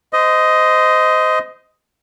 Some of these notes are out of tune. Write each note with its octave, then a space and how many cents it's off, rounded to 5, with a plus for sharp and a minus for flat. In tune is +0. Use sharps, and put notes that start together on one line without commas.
C5 -25 D#5 +10